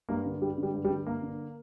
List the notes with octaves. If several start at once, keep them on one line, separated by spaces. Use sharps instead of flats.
G2 A#3
D3
G2 G3
D3
G3
G2
G3
D3
G2 A#3
D3